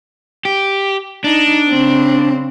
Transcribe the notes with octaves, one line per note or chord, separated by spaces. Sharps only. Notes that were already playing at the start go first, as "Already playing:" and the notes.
G4
D4 D#4
C#3 C4